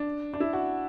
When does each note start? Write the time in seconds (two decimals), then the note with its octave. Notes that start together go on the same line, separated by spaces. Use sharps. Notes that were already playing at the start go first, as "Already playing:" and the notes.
Already playing: D4
0.34 D4
0.40 E4
0.53 F#4